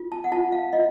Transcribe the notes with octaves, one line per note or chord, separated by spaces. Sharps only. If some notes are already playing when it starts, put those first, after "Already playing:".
Already playing: F4
A5
F#5
F4 A5
F5
F4 D#5